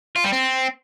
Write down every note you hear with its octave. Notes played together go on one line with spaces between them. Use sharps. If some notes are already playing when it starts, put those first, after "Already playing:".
F4
G3
C4